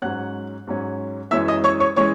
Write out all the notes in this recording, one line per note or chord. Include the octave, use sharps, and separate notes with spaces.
G#2 F#3 C#4 F#5 F#6
G#2 F#3 C#4
F#2 E3 G#3 C#4 E5 E6
D#5 D#6
C#5 C#6
C#5 C#6
E3 G#3 C#4 C#5 C#6